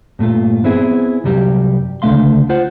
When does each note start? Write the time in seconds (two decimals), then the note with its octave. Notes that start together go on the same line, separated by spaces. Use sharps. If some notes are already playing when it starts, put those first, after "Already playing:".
0.19 G2 A#2 A3 F4
0.64 B3 C4 E4 G#4
1.24 C2 F#2 F#3 G3 G4
2.02 C#2 D3 E3 A3 F5 C6
2.49 F4 C5 F#5